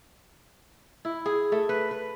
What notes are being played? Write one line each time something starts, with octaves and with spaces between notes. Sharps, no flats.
E4
G#4
A3
B4
B4